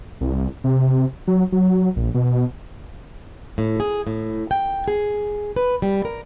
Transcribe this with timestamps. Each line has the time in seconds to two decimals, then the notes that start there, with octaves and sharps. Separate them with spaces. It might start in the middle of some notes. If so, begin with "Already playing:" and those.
0.21 C2
0.64 C3
1.28 F#3
1.52 F#3
1.96 A#1
2.14 B2
3.58 A2
3.80 G#4
4.07 A2
4.51 G5
4.88 G#4
5.56 B4
5.82 G3
6.05 A#4